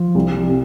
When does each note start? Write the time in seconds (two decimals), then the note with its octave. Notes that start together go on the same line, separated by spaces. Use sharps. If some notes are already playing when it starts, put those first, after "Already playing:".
Already playing: F3
0.15 C2
0.49 C3